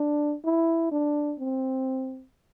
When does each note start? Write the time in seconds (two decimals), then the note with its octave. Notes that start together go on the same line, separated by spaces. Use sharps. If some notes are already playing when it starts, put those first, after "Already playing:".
Already playing: D4
0.45 E4
0.91 D4
1.39 C4